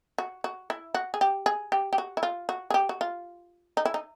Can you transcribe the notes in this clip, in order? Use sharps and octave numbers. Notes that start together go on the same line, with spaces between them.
F#4
F#4
E4
F#4
G#4
G4
G#4
G4
G4
F#4
E4
F4
F#4
G#4
G4
F#4
F4
D#4
E4
D#4